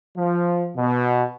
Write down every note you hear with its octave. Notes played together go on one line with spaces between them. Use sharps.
F3
B2